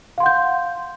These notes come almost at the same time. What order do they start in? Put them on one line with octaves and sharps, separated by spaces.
F5 C6 F#5 G6